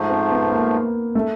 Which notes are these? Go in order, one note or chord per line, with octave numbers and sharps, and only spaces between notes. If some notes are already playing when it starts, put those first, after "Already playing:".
Already playing: G#2 F3 A3
C4
B3
A#3
A3